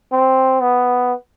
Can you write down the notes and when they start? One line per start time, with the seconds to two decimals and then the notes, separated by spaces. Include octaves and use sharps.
0.12 C4
0.61 B3